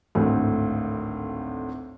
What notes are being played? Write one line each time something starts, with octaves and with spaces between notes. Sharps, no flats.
G#1 D2 A2